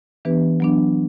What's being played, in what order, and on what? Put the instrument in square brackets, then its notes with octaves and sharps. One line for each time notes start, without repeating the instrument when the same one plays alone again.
[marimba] E3 B3 D4 G4 B4
F#3 B3 D4